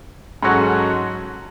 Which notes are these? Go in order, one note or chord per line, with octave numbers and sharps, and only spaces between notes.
G#2 F#3 C#4 F#4 A4